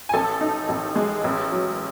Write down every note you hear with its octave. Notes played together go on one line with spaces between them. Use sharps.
G#5
A1 A4 A5
D#4
A1
G#3
A1
F#3